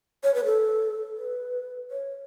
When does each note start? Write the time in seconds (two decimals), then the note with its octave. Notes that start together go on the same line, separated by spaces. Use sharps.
0.23 C#5
0.34 B4
0.45 A4
1.18 B4
1.91 C#5